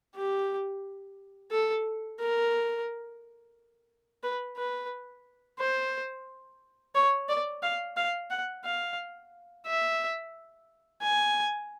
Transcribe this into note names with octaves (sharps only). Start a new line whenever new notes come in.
G4
A4
A#4
B4
B4
C5
C#5
D5
F5
F5
F#5
F5
E5
G#5